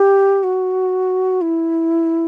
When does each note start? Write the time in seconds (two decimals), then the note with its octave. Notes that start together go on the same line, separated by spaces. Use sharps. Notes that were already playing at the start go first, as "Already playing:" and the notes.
Already playing: G4
0.44 F#4
1.41 E4